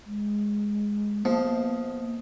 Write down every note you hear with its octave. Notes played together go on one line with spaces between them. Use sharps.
G#3
F3 A#3 B3